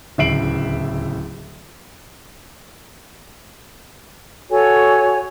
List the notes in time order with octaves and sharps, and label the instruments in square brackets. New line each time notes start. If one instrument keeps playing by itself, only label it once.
[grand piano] D1 C#2 E5 C7 D7 F#7
[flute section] F#4 A4 C#5 G#5